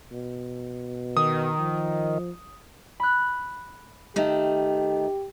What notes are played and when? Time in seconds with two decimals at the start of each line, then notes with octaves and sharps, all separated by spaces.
0.12 B2
1.17 D#3 D#6
1.59 F3
3.00 B5 F#6
4.16 D#3 A3 G4